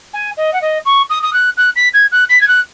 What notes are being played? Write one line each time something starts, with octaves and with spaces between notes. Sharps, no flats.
G#5
D#5
F#5
D#5
C#6
D#6
D#6
F#6
F#6
B6
G#6
F#6
B6
G#6
F#6